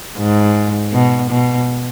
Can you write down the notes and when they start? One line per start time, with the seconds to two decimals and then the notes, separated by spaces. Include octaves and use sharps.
0.18 G#2
0.93 B2
1.31 B2